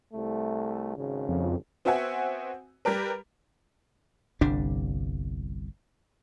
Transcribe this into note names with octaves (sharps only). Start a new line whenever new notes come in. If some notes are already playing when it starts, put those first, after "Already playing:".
C2 A3
G#1 C#3
F2
B3 C4 F#4 E5 F#5 G#5
G3 G4 A#4 B4
G1 C2 G3 D4